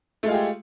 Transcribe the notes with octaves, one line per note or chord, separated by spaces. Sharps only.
G#3 A3 F4 G4 G#4